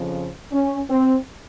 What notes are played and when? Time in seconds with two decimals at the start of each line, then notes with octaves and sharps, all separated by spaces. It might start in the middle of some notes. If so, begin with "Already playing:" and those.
Already playing: F2 C#3 F3
0.52 C#4
0.89 C4